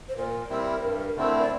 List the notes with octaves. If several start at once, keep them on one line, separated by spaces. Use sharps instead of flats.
C5
A#2 A#4
G3 C4 E4
G2
D3 A3 C4 E4
D5